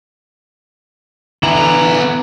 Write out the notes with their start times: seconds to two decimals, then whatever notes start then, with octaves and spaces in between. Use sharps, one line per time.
1.43 D3 E3 B3 E4 A#5